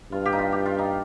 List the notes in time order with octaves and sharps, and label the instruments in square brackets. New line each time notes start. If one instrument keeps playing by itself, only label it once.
[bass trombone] G2 [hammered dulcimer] F4
[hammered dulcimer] G4
D#4
F4
G4
F4
D#4